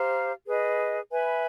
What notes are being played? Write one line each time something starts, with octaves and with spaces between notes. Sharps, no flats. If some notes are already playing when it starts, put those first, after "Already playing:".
Already playing: G4 C5 F5 A#5
G#4 B4 D#5
B4 E5 G#5 B5